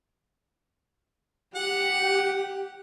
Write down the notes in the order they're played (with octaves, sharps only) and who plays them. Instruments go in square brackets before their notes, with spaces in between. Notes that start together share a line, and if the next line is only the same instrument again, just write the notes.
[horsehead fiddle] G4 [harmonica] F#5